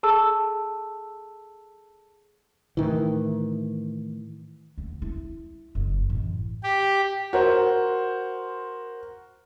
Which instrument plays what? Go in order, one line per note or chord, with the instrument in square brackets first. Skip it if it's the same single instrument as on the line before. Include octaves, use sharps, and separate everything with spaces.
[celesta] G#4 A4 A5 E6
[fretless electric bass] A2 D#3 E3
[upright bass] D2
E4
F#1
A1
[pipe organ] G4
[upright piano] F#4 A#4 C5